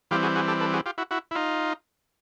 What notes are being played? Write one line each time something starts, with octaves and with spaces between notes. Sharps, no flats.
E3 G3 C4 F4 G4
F#4 G#4
F#4 G#4
G4 A4
A4 B4
F#4 G#4
F4 G4
E4 F#4
E4 F#4
E4
D#4 F4